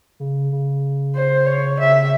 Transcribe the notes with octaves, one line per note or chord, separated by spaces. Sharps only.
C#3
C#3
C5
C#5
C#3 E5